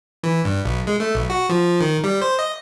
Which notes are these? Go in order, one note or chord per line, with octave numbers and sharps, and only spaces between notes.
E3
G2
B1
G#3
A3
B1
F#4
F3
D#3
G3
C5
D#5